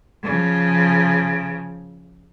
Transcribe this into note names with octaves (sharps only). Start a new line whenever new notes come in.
C#3 F3